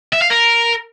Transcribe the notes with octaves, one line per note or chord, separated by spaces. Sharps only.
E5
F5
A#4